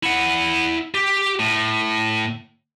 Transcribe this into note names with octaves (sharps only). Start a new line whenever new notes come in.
E4 F#5
G4
A2